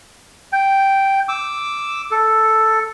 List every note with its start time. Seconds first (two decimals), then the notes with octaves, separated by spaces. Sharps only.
0.52 G5
1.29 D6 E6
2.11 A4